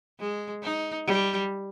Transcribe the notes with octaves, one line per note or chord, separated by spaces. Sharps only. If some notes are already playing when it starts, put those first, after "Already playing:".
G#3
D#4
G3